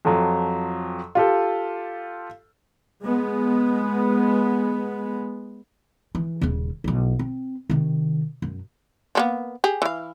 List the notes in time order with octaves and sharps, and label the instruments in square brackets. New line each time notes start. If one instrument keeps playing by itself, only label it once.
[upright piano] F2 F3 F#3
F4 G4 A4
[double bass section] G#3 B3
[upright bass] E3
D#1 C#3
B1 E4
C4
C3 D#3
F#2
[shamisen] F3 A#3 B3
G4 G#4
E3 F5